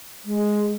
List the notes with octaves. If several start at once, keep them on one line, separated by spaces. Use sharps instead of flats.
G#3